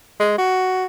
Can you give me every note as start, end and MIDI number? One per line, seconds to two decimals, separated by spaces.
0.20 0.37 56
0.38 0.86 66